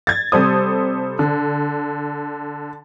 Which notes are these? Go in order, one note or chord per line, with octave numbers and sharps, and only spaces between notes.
G#6 A6
C3 G3 A4 C5 D#6
D3